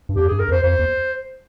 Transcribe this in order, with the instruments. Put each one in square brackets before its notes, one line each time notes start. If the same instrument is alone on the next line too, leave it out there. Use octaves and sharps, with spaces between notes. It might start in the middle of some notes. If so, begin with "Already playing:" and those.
[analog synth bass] G2
[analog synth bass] F2 [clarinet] G4
[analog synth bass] G2 [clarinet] G#4
[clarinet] A#4
[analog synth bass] F2 [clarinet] C5
[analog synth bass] F2 [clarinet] C5
[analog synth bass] E2